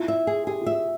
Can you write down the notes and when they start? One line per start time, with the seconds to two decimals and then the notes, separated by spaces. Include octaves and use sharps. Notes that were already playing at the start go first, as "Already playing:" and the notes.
Already playing: E4 F4
0.08 E5
0.27 G#4
0.47 G4 G#4
0.62 F4 E5